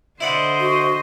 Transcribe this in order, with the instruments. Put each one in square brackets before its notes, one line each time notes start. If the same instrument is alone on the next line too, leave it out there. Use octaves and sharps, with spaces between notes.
[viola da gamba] D3 C5 D#5 [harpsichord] E4 D5 F#5
[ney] F#4